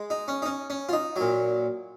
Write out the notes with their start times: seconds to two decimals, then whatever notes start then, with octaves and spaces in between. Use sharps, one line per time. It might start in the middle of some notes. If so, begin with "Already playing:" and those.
Already playing: G#3
0.10 D#4
0.28 C#4
0.42 D#4
0.46 C#4
0.70 C#4
0.89 F4
0.93 D#4
1.16 A#2 F#3